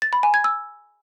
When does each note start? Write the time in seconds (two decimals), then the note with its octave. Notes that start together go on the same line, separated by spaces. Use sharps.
0.02 A6
0.13 B5
0.23 G#5
0.34 G#6
0.44 E6